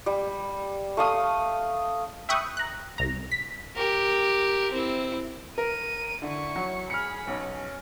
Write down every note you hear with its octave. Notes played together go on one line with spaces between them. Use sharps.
G3
A3 F5 D#6
E5 G5 B5 C#6 D#6 F#6
A#5 F#6
C2 A#5
B6
G4 A#4
C4 E4
A#4 D#7
D3 E4 C#6
F#3
G#4 B5 F6 C#7
B1 C#4